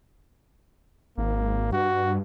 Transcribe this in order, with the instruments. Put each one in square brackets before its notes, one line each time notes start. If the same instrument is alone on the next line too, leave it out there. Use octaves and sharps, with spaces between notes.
[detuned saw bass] G#1 [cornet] A#3
[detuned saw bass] G2 [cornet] F#4